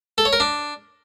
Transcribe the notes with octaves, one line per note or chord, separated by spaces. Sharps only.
A4
C#5
A#4
D4